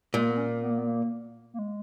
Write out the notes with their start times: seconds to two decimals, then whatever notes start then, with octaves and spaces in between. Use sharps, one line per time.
0.13 A#2 G#3
0.21 A#3
0.29 B3
0.37 C#4
0.62 B3
0.70 A#3
0.78 B3
0.86 A#3
1.54 A#3
1.59 G#3